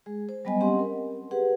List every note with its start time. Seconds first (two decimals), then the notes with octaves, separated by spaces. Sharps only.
0.06 G#3 G#4
0.29 C5
0.45 F#3 G3 B3 D#5 G#5
0.60 C4 C#4 G4 D#5 F#5 C6
0.79 A#4
1.31 G4 G#4 B4 F#5